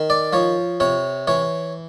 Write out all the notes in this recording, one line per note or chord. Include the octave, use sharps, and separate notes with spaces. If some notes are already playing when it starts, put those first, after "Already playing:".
Already playing: D#3
D5
F3 C#5
C3 C#5
E3 C#5